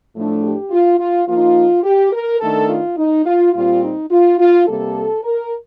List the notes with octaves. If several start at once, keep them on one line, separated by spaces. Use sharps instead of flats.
A2 F3 A3 D4
G4
F4
F4
F3 A#3 D#4 F4
G4
A#4
D#3 A3 D4 A4
F4
D#4
F4
A#2 G3 C4 F4
D#4
F4
F4
C3 G3 A#3 A4
A#4